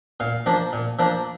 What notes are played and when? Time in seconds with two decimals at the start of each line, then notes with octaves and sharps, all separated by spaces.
0.20 A#2 F5
0.46 F3 A#3 D4
0.73 A#2
0.99 F3 A#3 D4